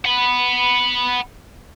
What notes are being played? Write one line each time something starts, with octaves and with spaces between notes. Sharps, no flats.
F#5 B5